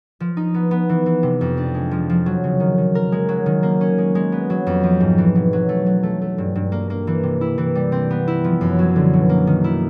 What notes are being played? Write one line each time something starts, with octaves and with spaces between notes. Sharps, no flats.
F3
D#4
B3
B3
E3
E3
C3
F2
D4
G#3
F3
F3
F#3
C#3
D#3
D#3
A#4
G#3
F#3
D#3
A#3
C#4
G#3
G#3
B3
F#3
F2
F3
G#2
E3
B2
F#3
A3
F#3
A3
A3
G2
G2
A#3
A#3
E3
C3
E4
E3
G3
C4
B3
E4
F3
F#2
F#3
D3
B2
A#3
D#3
E4